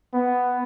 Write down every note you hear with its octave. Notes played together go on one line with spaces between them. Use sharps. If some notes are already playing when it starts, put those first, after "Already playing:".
B3